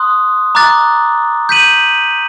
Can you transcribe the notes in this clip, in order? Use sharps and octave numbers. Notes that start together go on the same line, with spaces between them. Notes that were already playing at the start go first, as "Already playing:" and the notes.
Already playing: C6 D#6 F#6
A#5 D6 F#6 A6
G6 B6 D#7 F#7